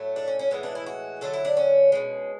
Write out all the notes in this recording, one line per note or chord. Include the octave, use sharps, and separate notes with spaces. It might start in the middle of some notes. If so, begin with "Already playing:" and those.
Already playing: A2 F#3 A3
D4
C#4
C#4
A2 E3 G#3 B3
D4
E4
F#4
D3 F#3 A3 A4
E4
D4
C#4
B2 G#3